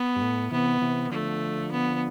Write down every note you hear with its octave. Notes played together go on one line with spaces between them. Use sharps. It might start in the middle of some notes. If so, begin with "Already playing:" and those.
Already playing: B3
G2
A2
C3 E3 B3
C3 E3
D3 F3 A3
B3